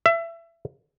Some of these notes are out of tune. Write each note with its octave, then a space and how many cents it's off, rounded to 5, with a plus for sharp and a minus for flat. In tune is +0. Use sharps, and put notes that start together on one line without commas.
E5 +25